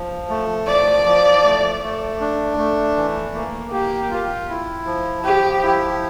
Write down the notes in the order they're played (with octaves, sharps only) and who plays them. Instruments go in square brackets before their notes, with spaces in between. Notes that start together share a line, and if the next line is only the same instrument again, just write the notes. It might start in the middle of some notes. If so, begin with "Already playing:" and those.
Already playing: [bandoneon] F3
A3
[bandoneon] F3 [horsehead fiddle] D5
[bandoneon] F3
A3
A3
D4
A3
E3
A#3
[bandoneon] A#3 [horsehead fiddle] G4
[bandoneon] F4
E4
F3
[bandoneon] F3 [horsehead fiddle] G4
[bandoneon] E4